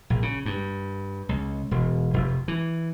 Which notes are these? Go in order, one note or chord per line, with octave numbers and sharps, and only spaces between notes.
A#1
C#3
G2
C#2
E1
F1
E3